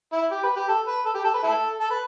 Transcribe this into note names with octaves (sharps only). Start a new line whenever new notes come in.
E4
G4
B4
G4
A4
B4
A4
G4
A4
B4
E4 A4
A4
B4